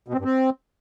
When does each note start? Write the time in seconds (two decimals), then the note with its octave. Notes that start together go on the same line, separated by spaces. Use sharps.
0.08 B2
0.14 C4
0.19 G2
0.25 C4